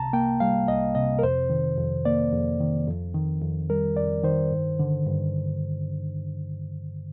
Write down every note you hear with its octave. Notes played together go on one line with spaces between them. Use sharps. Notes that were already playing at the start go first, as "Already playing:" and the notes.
Already playing: C2 C3 A5 A#5
A#3 G5
G3 F5
C2 D#5
C3 D#5
A#4
F2 C5
D#3
F2
A#3 D5
F2
D#3
F2
D#3
F2
G3 A#4
F2 D5
D#3 C5
G2
D3
G2